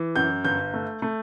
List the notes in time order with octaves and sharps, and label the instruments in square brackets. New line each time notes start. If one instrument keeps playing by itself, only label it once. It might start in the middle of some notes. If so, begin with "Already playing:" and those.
Already playing: [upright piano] E3
F#2 G6
G1 G6
A3
A3